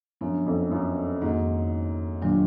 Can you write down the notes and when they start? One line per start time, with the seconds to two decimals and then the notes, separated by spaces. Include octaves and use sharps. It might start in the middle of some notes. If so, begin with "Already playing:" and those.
0.21 F#2 F3 B3 D4
0.46 F2
0.71 F#2
1.21 F2 G#2 D#3 A#3 D#4 F#4
2.22 A#2 D#3 F#3 D4